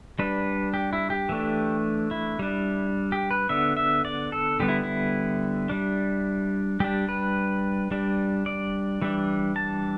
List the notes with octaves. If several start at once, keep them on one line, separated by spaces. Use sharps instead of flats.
G3 D4 B4
G4
E4
G4
E3 A3 D4
E4
G3 D4
G4
B4
D3 B3 D4 E5
E5
D5
A4
D3 G3 B3 G4
E4
E4
G3 D4
G3 D4 G4
B4
G3 D4
D5
E3 G3 D4
A5